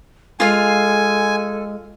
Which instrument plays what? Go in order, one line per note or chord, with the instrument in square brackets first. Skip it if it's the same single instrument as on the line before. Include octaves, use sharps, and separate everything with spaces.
[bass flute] G#3 [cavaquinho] F4 F5 [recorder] A4 [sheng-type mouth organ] G#5